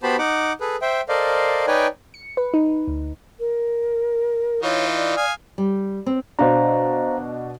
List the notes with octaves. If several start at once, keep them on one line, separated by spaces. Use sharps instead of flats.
B3 F#4 G4 C5 A5 B5
D#4 F#5 D6
G#4 A4 B4
C5 E5 G5
A4 A#4 C5 D5 D#5 F5
D#4 B4 C#5 D5 G5 G#5
C#7
B4
D#4
D2
A#4
E3 D#4 F4 C#5
D5
F5 G#5 D#6
G3
C4
B2 D4 C5 F5 A#5